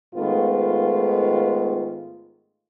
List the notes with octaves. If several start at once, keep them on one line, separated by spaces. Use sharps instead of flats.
G#2 D#3 A3 B3 F4